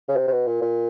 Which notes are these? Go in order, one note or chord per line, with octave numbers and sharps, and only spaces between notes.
C#3
C3
C3
B2
A#2
A#2